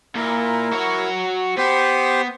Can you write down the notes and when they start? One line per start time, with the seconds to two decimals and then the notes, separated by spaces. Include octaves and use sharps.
0.16 A#2 E4 A#4
0.73 F#4 C#5
1.57 B3 G4 C5